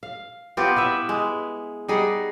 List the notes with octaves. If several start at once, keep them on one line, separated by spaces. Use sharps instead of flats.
F5
B3 C4 F4 G4
E4 B4 E5
G#3
G3 D#4 G#4 F#5